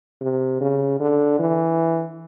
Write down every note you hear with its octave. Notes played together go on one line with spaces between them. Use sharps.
C3
C#3
D3
E3